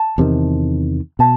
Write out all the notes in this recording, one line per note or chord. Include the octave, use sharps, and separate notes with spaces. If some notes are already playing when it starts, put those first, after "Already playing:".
Already playing: A5
E2 C3 D#3
B2 A5